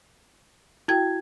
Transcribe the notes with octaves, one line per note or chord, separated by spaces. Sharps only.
E4 F#4 G5 G#6